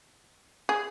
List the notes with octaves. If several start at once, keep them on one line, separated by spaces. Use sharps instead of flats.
G#4